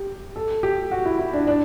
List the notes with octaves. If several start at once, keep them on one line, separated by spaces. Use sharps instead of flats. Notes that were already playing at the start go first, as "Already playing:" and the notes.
Already playing: G4
A4
G4
F#4
E4
E4
D4
D4